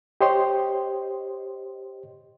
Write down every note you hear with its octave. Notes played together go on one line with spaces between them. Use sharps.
G4 C5 C#5 D#5 G5 C6